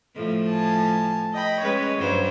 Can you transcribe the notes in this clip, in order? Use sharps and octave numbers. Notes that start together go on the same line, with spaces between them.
A2 F3
G#5 A5
D#5 G5 B5
G#3 C#4 B4 C#5
G2 F#3 C5